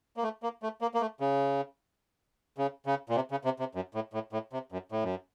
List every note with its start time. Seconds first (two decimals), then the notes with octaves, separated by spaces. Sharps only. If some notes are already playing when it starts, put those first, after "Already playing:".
0.17 A#3
0.23 A3
0.43 A#3
0.63 A3
0.81 A#3
0.94 A#3
1.01 A3
1.20 C#3
2.58 C#3
2.86 C#3
3.09 A#2
3.15 C3
3.31 C#3
3.45 C3
3.59 C3
3.75 F#2
3.94 A2
4.13 A2
4.33 A2
4.53 C3
4.72 F#2
4.92 A2
5.03 F#2